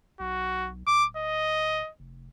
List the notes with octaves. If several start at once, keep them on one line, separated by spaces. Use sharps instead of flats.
B1 F#4
D1 D6
D#5
F1